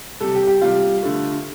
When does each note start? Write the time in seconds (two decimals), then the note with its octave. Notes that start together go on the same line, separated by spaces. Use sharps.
0.21 C3 G3 A4
0.35 G4
0.47 G4
0.61 C3 G3 F4
1.03 D3 A3